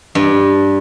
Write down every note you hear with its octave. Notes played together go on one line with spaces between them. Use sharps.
G2